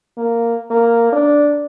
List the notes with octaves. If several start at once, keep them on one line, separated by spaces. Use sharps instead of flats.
A#3
A#3
D4